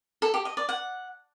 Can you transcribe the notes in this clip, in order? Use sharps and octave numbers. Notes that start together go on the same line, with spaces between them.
A4
G4
D#5
D5
F#5